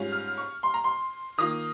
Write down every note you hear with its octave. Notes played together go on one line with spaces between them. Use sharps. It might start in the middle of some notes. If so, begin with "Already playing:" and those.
Already playing: G#2 G3 C#4 F4
F6
C#6
C6
A#5
C6
D#3 A#3 F4 D#6